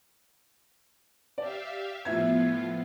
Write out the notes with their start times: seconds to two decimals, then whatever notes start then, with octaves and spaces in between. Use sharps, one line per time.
1.38 G4 D5 E5 F5
2.05 A2 F3 B3 F4 E5 G#6